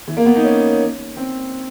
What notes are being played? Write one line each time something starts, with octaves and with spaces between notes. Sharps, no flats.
E3
A#3
B3
D#4
C#4
C4